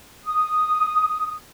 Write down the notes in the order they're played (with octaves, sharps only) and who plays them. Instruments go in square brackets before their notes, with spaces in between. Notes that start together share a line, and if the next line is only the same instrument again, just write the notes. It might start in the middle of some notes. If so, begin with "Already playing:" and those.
[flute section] D#6